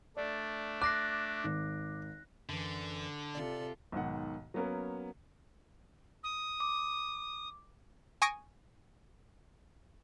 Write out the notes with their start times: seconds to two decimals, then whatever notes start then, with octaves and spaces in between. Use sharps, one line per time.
0.17 A3 D4 D5
0.82 D6 F#6 A#6 C7
1.44 G#1
2.49 F#2 D3 E3
3.35 C3 F4 A4 D5
3.92 B1 G#2 D#3 F#5
4.54 F#3 A#3 B3 C#4 A#4
6.23 D#6
6.60 D6
8.22 G#5 C#6 D#6 A#6 D7